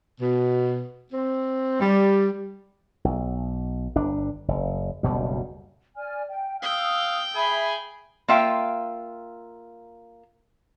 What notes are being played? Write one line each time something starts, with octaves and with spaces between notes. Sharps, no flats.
B2
C4
G3
B1
G1 D4
F#1
F#1 D2 B2 G3
D5 G#5 F6
G5
F5 G5 D#6 E6
G#4 E5 B5
A#3 F4 E5 F5 G5